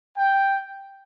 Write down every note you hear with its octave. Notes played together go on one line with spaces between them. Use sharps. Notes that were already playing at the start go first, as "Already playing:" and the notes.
G5